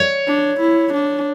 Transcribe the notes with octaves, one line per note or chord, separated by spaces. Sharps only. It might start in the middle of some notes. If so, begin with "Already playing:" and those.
Already playing: C#5
D4
E4
D4